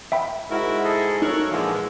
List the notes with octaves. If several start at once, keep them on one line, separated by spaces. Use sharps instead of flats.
E5 G5 B5
G#2 E4 F#4 A#4
G#4 A4 D#5
F#3 D#4 A4 A#4 C#5 C#6 F#6
A#2 D3 E3 F3 G#3 E4 F4